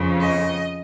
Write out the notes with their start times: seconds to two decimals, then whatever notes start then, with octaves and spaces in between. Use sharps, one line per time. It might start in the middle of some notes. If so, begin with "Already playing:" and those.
Already playing: F2 C#3
0.21 D#5